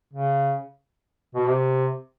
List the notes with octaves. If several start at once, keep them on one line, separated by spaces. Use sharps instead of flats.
C#3
B2
C3